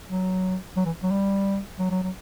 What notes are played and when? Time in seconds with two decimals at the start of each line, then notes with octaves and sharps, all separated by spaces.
0.08 F#3
0.77 F#3
0.85 E3
1.03 F#3
1.11 G3
1.79 F#3
1.90 F#3
2.03 F#3